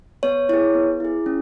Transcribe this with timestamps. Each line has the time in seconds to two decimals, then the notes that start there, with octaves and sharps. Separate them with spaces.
0.23 B3 C#5
0.49 E4 G#4 C#5
0.75 B3
1.00 E4 G#4
1.26 C#4